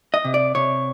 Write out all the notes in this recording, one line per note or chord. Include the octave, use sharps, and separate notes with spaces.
D#5
C3
D5
C3 C#5